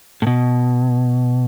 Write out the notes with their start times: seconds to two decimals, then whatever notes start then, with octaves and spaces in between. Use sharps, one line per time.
0.22 A2
0.27 B2